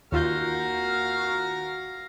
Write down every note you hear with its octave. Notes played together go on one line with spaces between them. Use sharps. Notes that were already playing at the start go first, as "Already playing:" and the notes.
D#2 F4 F#4 A#4 F5 A#5 G6